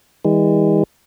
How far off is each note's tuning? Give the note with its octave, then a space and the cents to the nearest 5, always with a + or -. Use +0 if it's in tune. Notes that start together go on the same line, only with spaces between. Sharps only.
E3 -45 G#3 -45